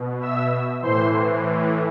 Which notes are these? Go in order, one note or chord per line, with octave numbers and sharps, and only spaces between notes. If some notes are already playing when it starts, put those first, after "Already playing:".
Already playing: B2
E5 E6
A2 E3 C5 C6